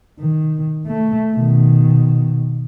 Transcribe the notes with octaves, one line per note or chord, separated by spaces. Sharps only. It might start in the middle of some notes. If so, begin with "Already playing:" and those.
D#3
A3
B2 D#3